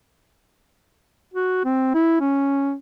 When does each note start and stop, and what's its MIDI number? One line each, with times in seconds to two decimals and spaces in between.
1.34 1.61 66
1.65 1.92 60
1.94 2.20 64
2.21 2.74 61